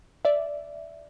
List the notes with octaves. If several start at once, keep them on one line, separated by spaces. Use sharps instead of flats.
D5 E5